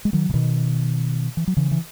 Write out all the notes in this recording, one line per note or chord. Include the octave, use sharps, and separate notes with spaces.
G#3
D#3 F#3
C#3
B2 D#3
E3
F#3
C#3 E3
E3